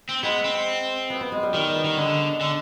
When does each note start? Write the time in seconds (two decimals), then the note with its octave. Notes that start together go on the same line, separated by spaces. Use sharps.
0.09 C4
0.23 G#3 B3
0.44 C4
1.10 B3
1.21 B3
1.32 G#3
1.43 G3
1.53 D#3 G3
1.75 B3
1.85 D#3
1.97 D3 G#3
2.41 D3